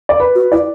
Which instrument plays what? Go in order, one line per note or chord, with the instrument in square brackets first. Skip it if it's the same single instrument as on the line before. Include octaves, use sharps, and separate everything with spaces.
[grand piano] D5
B4
[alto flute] F#4
[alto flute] E4 [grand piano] D5